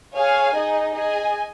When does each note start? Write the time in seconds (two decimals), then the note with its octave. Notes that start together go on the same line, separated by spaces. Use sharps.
0.13 G#4 C#5 F5 G#5
0.55 D#4 G#4 D#5
0.96 G#4 D#5 G#5